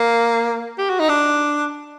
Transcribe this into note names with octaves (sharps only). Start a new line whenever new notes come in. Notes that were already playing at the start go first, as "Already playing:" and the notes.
Already playing: A#3
G4
F#4
D#4
D4